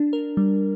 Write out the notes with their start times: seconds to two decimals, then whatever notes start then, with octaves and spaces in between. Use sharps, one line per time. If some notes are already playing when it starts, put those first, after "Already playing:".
Already playing: D4
0.13 A#4
0.37 G3